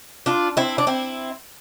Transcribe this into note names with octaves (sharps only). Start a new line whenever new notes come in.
D4 F4
C4 E4
D4
C4 E4